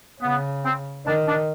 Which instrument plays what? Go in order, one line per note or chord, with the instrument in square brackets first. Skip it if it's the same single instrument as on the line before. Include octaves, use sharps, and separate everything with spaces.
[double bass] C#3 [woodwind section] B3
[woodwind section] C4
[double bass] D#3 [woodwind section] D4
[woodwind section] D4